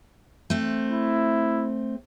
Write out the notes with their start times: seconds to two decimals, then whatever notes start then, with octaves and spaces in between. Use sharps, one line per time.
0.50 A3 C4
0.90 E4